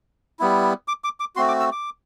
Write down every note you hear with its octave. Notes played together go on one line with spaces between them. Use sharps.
G3 B3 E4
D6
D6
D6
A3 C4 F#4 C6
D6
E6
D6